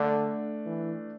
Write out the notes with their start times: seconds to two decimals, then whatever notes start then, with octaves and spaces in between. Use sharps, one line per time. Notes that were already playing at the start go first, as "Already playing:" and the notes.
Already playing: D3 A3 D4
0.65 E3